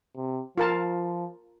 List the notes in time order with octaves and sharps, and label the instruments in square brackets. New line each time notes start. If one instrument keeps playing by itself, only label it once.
[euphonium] C3
[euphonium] F3 [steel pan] F4 A#4 A5